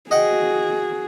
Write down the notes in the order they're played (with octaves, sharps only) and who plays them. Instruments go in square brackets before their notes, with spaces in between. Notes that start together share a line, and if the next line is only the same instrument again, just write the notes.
[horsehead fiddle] F#4 G#4 [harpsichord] D#5 F#5 G5